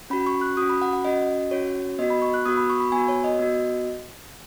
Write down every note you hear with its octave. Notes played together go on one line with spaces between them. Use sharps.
C#4 F#4 B5
C#6
F#6
C#4 F#4 D#6
B5
F#5
F#5
C#4 F#4 D#5
C#4 F#4 C#5
B3 F#4 D#5
B5
C#6
F#6
B3 F#4 D#6
B5
C#6
B5
B3 F#4 G#5
C#5
D#5
B3 F#4